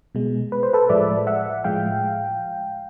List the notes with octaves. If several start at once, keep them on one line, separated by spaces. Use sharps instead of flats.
B2 G#3
B4
C5
A4 B4
A2 F3 G#3 D5 E5
E5 F#5
A2 F3 G#3 F5 G5